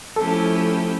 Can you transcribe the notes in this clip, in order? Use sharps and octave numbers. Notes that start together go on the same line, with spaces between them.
F3 A3 C#4 E4 G4 A4